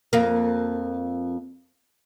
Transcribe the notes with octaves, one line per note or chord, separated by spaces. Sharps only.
F2 A#3